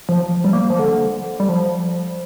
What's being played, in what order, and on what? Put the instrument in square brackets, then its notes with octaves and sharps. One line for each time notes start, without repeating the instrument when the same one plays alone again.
[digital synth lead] F3
G3
A#3
F3
D3
G3
F3